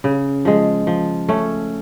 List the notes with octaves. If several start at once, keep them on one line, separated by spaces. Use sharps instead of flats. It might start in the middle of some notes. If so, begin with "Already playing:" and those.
C#3
F3 G#3
F3
A3 C#4